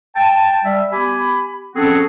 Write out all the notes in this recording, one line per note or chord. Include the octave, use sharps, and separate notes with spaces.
G5 A5
G3 E5
B3 G4 G#5 B5
F3 C4 C#4 F#4 G#4 A4